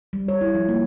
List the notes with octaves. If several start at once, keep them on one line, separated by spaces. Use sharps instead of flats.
G3
C#5
E4
F3
A#3